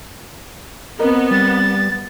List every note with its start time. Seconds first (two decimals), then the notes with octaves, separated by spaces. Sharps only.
1.00 B3 C4 A#4 D#5
1.31 G3 A6